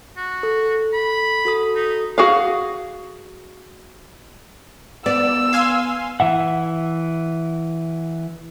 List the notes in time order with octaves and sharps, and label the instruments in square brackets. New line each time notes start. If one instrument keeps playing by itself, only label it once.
[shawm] F#4
[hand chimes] A4
[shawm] B5
[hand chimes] F#4 A4 D#6
[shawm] D#4
[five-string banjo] F#4 G#4 F5
[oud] B3 [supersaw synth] D5 [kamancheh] E6
[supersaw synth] F5 G#5 C6
[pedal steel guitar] E3 E5 F#5